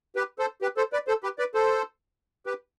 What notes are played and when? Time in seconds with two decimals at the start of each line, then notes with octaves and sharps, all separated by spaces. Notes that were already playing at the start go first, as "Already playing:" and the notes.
0.16 G4 B4
0.39 A4 C5
0.62 G4 B4
0.77 A4 C5
0.93 B4 D5
1.07 A4 C5
1.23 G4 B4
1.39 B4 D5
1.55 A4 C5
2.46 G4 B4